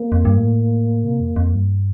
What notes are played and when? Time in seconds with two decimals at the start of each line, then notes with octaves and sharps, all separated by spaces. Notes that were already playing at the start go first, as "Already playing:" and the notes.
Already playing: A#3
0.12 F2
0.25 G2
0.38 A2
1.04 C3
1.20 F2
1.36 F2
1.54 G2